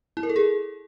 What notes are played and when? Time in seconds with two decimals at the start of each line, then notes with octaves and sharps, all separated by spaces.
0.17 E4
0.23 A#4
0.29 A4
0.36 G#4